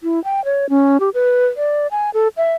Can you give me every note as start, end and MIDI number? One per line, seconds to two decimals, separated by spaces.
0.03 0.22 64
0.24 0.44 79
0.45 0.69 73
0.69 0.98 61
1.00 1.09 67
1.14 1.47 71
1.57 1.87 74
1.91 2.10 80
2.14 2.28 69
2.37 2.54 76